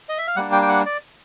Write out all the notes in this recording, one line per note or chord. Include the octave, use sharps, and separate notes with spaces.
D#5
E5
F5
G3 A#3 D4 F#5
G5
G5
F#5
D5